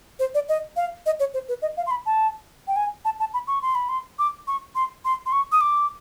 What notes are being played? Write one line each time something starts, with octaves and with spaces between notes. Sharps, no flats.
C5
D5
D#5
F5
D#5
C#5
C5
B4
D#5
F5
C6
B5
A5
G5
G#5
A5
A5
B5
C#6
C6
B5
C6
D6
C#6
C6
C6
C6
C#6
D#6
D6